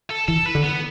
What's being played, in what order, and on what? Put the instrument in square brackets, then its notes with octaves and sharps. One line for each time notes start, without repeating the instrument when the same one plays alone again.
[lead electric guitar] A4
[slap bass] E3 [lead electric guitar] A4
[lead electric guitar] B4
[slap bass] D3
[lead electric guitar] B3